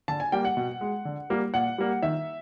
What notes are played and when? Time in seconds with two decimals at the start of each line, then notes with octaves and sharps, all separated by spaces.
0.08 D3 A5
0.20 G#5
0.32 G3 A#3 G5
0.45 F#5
0.57 B2
0.81 G#3
1.05 D3
1.30 G3 A#3
1.54 A#2 F#5
1.78 G3 A#3
2.02 D#3 E5